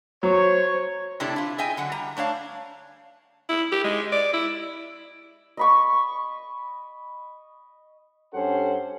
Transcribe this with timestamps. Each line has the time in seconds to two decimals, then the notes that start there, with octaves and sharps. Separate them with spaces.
0.23 F#3 C5 C#5
1.20 A2 C3 D4 E4 G4 A4
1.36 E4 F4
1.58 G#4 D#5 E5 G5 G#5
1.77 D3 F#3 F#5
1.92 G3 A#5
2.17 A3 D4 C#5 F5
3.49 E4
3.72 G4
3.84 G#3
4.12 D5
4.33 E4
5.57 D#5 B5 C#6
8.34 G2 C#4 G4 A4 C5 F#5